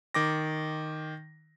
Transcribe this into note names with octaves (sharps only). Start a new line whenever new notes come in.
D#3 D6 A#6